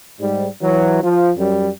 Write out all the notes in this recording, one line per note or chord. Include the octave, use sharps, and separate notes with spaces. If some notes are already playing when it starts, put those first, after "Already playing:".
G#2 G3
E3 F#3
F3
F#2 G3